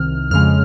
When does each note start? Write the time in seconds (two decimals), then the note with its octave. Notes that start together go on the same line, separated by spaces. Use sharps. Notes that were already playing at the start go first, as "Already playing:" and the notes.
Already playing: C2 C3 D#3 F6
0.31 F2 C#3 G#3 F6